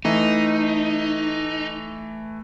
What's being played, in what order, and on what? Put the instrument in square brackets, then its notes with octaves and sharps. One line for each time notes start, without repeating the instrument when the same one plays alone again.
[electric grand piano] E3 A3 [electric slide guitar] D#4